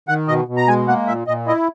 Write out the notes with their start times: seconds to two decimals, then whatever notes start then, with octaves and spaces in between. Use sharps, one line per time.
0.08 D#3 F#5
0.28 B2 D#5
0.48 B2
0.57 A#5
0.68 G#3 G#5
0.88 A#3 F#5
1.07 A#2 E5
1.27 A#2 D#5
1.47 E4 D#5